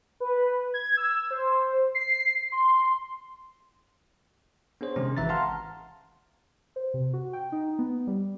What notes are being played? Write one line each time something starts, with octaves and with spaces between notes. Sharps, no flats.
B4
G#6
E6
C5
C7
C6
B3 D4 G#4 C5 C#5
C3 D#3 G#3 C#4
G#1 E3 E5 A#5 A6
F5 F#5 A5 A#5 C6 F6
C5
C3
F#4
G5
D#4
B3
G3